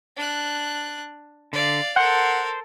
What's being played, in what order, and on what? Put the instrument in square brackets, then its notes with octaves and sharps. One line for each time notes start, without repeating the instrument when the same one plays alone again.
[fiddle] D4 F#6
[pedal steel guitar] D3 [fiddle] D5 F5
[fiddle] A4 A#4 [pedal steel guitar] C5 [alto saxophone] F#5